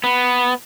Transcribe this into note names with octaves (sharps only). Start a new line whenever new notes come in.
B3